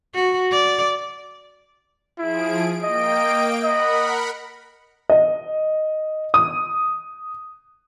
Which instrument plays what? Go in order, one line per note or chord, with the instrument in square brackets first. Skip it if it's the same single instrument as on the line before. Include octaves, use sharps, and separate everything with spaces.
[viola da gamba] F#4
D5
[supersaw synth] F3 G#4 D7 [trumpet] E4
[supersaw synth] A#3 G5 D7 [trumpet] D#5
[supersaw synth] A#4 F#5 B5 [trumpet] D#5
[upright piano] D#5
D#6